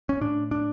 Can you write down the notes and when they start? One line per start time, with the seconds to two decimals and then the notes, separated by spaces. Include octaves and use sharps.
0.09 C#4
0.21 A2 D4
0.51 D4